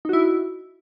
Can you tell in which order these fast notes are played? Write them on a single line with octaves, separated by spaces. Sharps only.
D#4 F#4 E4